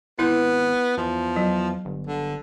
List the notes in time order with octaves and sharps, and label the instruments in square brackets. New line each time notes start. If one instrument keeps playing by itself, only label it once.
[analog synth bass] G#1 [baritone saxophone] B3 [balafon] E4 B4
[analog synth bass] E2 [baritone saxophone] F3
[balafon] F#3
[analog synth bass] G1
[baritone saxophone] D3